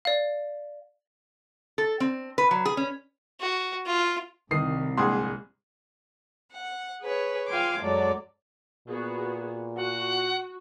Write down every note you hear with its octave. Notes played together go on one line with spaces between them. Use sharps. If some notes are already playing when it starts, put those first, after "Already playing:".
D5 F5
A4
C4
B4
F#3
G#4
C#4
F#4
F4
C2 D#3 D#6 C7
A#1 G#2 G#4 C6
F#5
G#4 B4 C#5
F4 F5 G5 G#5 C6 D6
F#2 F#3 G#3 A4 D5
A#2 B3 F#4 G#4
F#4 F#5